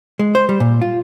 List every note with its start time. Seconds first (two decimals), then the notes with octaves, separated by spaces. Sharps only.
0.19 G#3
0.35 C5
0.49 G3
0.60 A#2
0.82 F4